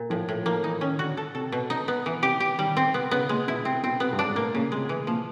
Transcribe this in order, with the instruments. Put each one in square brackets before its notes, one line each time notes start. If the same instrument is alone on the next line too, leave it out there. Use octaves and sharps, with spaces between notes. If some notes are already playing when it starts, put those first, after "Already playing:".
Already playing: [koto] A#2
[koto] A2 [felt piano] F3
[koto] A2
[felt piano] F3 [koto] A#3
[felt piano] E3 [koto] D#4
[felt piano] D#3 [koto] C#4
[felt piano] D3 [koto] F#4
[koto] A4
[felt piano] C3 [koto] A4
[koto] B2
D#4
B3
E3
[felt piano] C3 [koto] G4
[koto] G4
[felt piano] D#3 [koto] G3
[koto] C4
[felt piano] C3 [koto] B3
[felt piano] C#3 [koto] B3
[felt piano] A#2 [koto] G#3
[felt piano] B2 [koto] E4
[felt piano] C3 [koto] C4
[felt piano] B2 [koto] C4
[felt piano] C3 [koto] B3
[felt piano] G2
[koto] D4
[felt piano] G#2
[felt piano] A2 [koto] A#3
[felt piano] A#2 [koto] C#3
[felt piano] C3 [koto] G#3
[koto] E3
[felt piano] A#2 [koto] F3